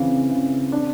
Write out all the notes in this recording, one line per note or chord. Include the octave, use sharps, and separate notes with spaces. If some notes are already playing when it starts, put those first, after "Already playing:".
Already playing: C#3 E3 C4
C#3
D4